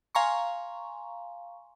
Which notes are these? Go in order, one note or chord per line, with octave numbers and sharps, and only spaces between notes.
F5 G#5 A#5 C6 C#6